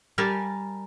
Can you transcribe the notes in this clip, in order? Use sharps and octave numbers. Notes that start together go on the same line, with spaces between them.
G3 G4 A#4 D5 G#5 A5